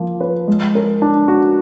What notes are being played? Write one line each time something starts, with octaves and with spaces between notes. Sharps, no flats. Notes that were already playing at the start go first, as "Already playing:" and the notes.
Already playing: F3 A#3 F4
B4
G#3
A#4
D4
F#4